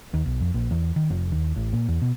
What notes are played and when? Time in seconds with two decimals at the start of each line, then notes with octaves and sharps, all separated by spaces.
0.14 D#2
0.26 B1
0.40 F2
0.54 A#1
0.71 E2
0.96 D#3
1.10 F1
1.32 D#2
1.56 A1
1.73 A#2
1.88 E2
2.02 B2